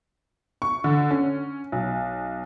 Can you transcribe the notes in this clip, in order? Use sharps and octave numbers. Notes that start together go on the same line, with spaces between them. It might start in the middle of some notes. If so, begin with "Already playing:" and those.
C#6
D3
C#4
B1